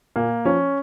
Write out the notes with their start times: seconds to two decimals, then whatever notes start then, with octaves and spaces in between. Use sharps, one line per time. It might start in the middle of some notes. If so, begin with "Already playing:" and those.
0.16 A#2 A#3
0.45 F3 C#4